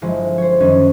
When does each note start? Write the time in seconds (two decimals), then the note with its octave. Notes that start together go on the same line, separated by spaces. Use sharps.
0.02 G1 F3 F#3 G#3 E4
0.38 C5 C#5
0.60 F#2 D#3 F#3 G3 C#4 D4